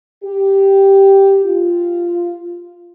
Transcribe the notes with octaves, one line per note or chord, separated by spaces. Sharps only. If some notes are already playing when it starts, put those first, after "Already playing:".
G4
F4